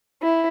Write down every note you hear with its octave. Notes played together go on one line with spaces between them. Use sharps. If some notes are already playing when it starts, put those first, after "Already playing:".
E4